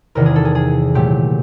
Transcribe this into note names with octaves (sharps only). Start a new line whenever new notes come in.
E2 C3 D#3 A#4
G#4
A4
G#4
G#4
A#2 F#3 A3 G4